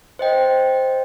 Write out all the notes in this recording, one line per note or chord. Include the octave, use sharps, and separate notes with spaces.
C5 D#5 G5